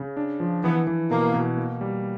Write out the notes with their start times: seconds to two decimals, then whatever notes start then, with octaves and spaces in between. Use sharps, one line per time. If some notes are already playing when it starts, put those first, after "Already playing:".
Already playing: C#3
0.17 D4
0.40 F3
0.64 E3 B3
0.87 E3
1.10 B2 A#3
1.34 B2
1.57 A#3
1.81 G3